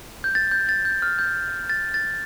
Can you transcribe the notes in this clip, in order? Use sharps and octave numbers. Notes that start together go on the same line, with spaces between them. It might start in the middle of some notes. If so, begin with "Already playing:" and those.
G6
A6
G6
A6
G6
F6
G6
A6
A6